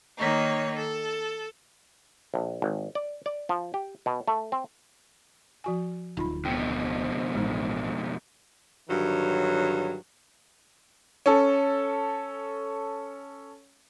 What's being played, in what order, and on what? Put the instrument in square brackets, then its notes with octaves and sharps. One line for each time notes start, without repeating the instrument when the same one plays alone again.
[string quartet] D#3 A#3 D#4 C#5
A4
[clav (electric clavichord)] A#1
G#1
D5
D5
F3
G4
B2
A3
C4
[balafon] F3 F#4 G#5
[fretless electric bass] D1 [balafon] D#4 F4 B5
[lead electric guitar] F2 B2 [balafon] G5
[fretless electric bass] A1 [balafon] G#3 D#4
[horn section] G2 D3 D#3 F#3
[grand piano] C#4 A4